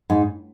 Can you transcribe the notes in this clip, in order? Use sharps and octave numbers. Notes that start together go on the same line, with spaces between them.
G#2